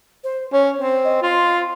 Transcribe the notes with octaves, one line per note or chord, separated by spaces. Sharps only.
C5
C#4 C#5
C4 C5
D#5
F4 C6